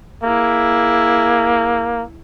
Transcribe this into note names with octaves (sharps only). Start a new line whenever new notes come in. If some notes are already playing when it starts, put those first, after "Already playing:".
A#3 E4 G#4